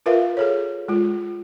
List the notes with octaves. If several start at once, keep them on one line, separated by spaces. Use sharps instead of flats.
F4 A#4 B4 E5 F5
G#4 A4 C#5
G#3 F4